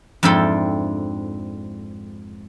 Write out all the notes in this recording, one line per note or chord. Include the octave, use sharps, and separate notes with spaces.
F2 G#2 D4 E4 A4 G5